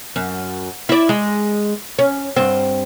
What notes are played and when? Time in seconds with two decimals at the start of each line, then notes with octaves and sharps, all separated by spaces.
0.16 F#2
0.89 E4 D5
1.09 G#3
1.99 C#4
2.36 G2 C4